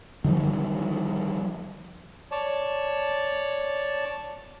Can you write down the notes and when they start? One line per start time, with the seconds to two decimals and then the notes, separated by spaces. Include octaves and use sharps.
0.24 D3 D#3 F3 G3
2.31 C#5 D5 A5